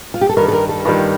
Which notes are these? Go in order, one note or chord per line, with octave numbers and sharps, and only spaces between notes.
F4
G4
A4
G2 D#3 G3 A#4
A4
A#4
A4
G2 D#3 G3 F4